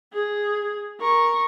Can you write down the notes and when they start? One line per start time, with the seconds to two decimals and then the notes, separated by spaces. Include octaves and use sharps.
0.13 G#4
1.00 A#4 C#6